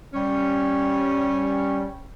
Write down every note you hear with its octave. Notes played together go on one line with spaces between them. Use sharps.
G3 C#4